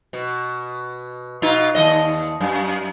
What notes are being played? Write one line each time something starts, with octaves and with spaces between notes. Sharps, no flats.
B2
B2 D#4 F4
D#2 A#2 D#5
F#2